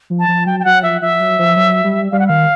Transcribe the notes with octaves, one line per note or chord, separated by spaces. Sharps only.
F3
A5
F3
F#3 G5
G5
F#3 F#5
F3 E5
F3 E5
F#3
F3
F#3
G3
G3 F5
F#5
D#3 F5